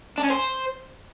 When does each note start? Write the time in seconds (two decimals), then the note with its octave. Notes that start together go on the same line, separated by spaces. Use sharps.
0.18 D4
0.24 C#4
0.30 C5